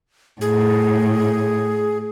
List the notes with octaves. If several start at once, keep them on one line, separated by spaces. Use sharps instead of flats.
A2 G#4